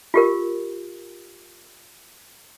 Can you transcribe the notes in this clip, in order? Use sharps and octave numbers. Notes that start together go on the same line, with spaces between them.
F4 G4 A#4